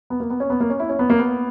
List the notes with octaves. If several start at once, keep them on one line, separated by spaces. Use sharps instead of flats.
B3
A#3
B3
C#4
B3
A#3
C#4
E4
C#4
B3
A#3
B3